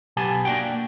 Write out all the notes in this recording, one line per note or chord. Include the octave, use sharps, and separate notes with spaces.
B1 B3 G4 G#5 A5
A#3 D4 F4 F#4 G5